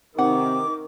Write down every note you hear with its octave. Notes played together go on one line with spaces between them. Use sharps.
C3 D#3 F#5 D6